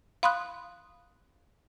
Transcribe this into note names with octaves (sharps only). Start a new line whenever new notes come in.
F5 B5 C6 D#6 F#6